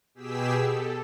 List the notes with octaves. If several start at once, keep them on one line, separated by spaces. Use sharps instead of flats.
B2 G4 G#4 E6 B6
A4